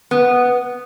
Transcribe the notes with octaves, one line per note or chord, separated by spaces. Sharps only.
B3